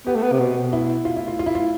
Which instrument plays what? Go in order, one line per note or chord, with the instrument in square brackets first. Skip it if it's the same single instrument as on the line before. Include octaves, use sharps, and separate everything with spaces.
[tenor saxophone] B3 [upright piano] G4
[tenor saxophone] A3
B3
C3
B2
[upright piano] E4
F4
E4
F4
F4
E4
F4